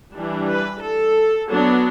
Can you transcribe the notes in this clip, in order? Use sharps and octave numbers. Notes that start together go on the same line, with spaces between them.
E3 G3 D4
B4
A4
F#3 B3 D4